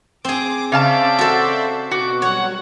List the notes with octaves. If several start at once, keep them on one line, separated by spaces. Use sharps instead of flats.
C4 G#4 D6
C#3 C5 D5 E5 F5 A5 D6
F#4 A4
B2 F#4 D6
F#3 G3 C#5 F#5